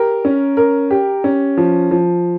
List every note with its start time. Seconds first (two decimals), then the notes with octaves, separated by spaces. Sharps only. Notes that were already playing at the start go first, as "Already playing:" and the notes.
Already playing: G4 A#4
0.25 C#4
0.57 A#4
0.91 G4
1.24 C#4
1.57 F3
1.91 F3